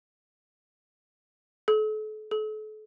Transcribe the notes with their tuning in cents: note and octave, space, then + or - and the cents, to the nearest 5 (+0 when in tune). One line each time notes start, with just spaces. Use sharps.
A4 -40
A4 -40